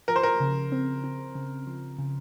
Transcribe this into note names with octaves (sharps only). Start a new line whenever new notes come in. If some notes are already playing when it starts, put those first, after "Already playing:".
F3 A#4
C5
A#4
C#3
C4
C4
C#3
F3
C#3